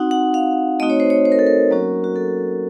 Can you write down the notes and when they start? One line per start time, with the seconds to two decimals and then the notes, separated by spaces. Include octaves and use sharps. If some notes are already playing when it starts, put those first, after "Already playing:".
Already playing: C4 D#4 F#4 F#5
0.11 F#5
0.34 F5
0.80 A3 C4 D#4 F#4 D#5
0.90 C#5
1.00 C5
1.10 C#5
1.25 C5
1.32 A#4
1.39 A4
1.47 A#4
1.71 F#3 A#3 C#4 F#4
2.04 F#4
2.16 A4